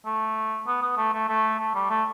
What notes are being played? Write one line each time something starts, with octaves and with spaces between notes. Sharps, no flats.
A3
B3
B3
A3
A3
A3
A3
G3
A3